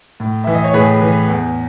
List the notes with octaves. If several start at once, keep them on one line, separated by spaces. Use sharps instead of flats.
A2
E3 E5
D#5
C#5
A2 G#4 B4
E3
E2